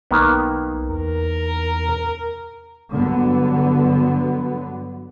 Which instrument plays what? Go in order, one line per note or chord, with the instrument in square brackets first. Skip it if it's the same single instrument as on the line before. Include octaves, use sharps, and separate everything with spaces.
[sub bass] B1 [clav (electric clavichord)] D#3 A#3 B3
[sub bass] E2 [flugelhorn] A#4
[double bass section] G2 D3 F#3 B3